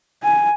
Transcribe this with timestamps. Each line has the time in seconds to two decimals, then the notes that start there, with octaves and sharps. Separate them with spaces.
0.24 G#5